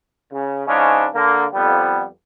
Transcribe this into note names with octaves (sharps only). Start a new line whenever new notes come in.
C#3
G#2 C#3 F3 G#3 C#4 D4
D3 A#3
F2 G3 B3